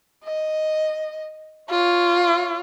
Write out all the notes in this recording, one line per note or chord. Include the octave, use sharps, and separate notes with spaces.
D#5
F4 C#5